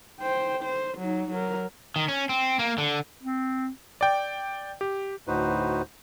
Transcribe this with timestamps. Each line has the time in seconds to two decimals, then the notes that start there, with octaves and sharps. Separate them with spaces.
0.19 C5 G5
0.64 C5
0.98 F#3 D#4
1.31 F#3 A#4
1.96 D#3
2.08 C#4
2.29 C4
2.59 A#3
2.78 D3
3.23 C4
4.01 D5 G5
4.81 G4
5.27 D2 A2 D#4 F#4 B4 C5